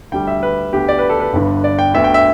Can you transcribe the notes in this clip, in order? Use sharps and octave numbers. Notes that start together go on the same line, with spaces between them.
D2 D3 G3 G5
E5
B4
D2 D3 B3 G4
D5
B4
A4
B4
G1 G2 D3
D5
G5
D2 D3 B3 E5
G5
E5